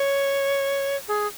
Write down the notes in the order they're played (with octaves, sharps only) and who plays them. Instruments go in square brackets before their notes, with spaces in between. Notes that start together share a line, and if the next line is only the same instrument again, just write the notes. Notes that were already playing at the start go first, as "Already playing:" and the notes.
Already playing: [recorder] C#5
G#4